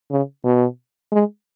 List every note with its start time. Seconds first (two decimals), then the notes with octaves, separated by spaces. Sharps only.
0.11 C#3
0.45 B2
1.12 G#3